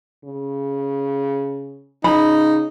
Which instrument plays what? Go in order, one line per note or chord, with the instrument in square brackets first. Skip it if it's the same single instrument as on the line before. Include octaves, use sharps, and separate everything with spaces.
[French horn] C#3
[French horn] C#3 [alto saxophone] D#4 [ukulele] B5